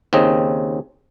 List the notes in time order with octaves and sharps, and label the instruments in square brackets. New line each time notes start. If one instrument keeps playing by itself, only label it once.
[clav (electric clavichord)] D#2 C#3 C4 D#5